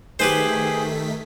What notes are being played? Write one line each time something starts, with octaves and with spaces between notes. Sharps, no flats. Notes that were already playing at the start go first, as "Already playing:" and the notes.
D#3 A3 G4 G#4 B4 C5 B6